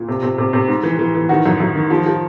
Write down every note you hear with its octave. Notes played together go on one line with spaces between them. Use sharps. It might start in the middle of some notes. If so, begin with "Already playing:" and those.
Already playing: A#2
C3
C3
C3
C3
G#2
E3
E3
E3
D#3 F#4
F#2
F#2
D#3
F3
F3